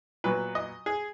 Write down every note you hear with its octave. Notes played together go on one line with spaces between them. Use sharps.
A#2 F#3 B3 B4
D#5
G#4